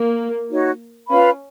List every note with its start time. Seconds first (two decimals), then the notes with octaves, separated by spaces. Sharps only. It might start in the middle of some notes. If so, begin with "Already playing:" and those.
Already playing: A#3
0.50 D#4 F#4 C#5
1.09 C#4 F4 B4 F5 B5